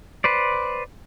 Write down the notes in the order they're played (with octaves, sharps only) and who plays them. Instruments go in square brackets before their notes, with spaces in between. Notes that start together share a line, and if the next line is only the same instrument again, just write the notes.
[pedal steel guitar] B4 C5 D5